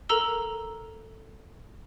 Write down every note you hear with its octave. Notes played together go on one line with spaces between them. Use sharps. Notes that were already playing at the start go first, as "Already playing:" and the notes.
A4 A#4 A#5 E6 G7